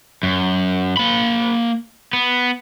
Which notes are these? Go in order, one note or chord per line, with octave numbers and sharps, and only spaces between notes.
F#2
A#3 B5
B3